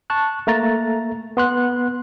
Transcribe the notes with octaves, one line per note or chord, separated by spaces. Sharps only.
A5 C#6 F#6
A3 A#3 A#5 A6
B3 C6 F#6